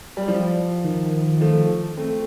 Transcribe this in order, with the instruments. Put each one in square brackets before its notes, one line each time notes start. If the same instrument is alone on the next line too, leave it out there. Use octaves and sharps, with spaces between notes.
[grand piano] G3
F3
[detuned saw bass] D#3
[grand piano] F3 A3
A3 C4